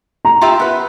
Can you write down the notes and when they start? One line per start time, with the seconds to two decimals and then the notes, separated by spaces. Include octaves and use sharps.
0.25 A#5
0.41 F4 G4 E5
0.60 B3 B4